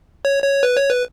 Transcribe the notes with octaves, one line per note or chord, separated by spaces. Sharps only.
C#5
C#5
B4
C#5
B4